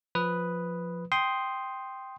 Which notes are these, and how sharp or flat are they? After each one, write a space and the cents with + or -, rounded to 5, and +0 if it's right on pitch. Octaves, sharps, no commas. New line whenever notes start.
F3 +10 B4 +0 D#6 +0
G5 +0 C6 +0 D#6 +5